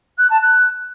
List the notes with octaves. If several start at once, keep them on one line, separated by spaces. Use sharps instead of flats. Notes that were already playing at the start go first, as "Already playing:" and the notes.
F#6
A5
F#6